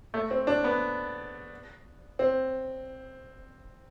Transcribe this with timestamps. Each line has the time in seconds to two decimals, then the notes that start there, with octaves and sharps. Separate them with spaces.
0.14 A3
0.31 C4
0.47 D4
0.64 B3
2.19 C4